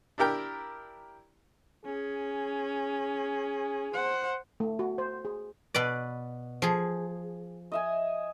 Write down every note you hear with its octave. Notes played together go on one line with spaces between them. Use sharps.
D4 E4 G4 A#4 G5
C#4 G#4
C5 F#5
A3
F#4
C5
G#4
B2 B4 D5
F3 G#4
D#5 E5 G#5